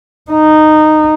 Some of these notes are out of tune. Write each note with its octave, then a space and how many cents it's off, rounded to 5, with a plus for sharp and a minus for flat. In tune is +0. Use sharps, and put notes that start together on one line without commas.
D#4 -10